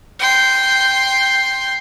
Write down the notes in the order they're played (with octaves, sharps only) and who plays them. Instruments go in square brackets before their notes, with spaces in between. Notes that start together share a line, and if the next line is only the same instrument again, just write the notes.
[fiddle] G5 C6